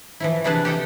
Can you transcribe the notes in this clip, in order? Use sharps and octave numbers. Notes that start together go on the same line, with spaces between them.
E3 F3 E4
C3 D4 E4 G#4 B4 A5
G4 A4 D#5 G5